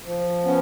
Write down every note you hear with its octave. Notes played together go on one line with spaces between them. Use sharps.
F3
B3 C#4